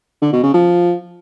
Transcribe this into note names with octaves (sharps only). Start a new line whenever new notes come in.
D3
B2
C#3
F3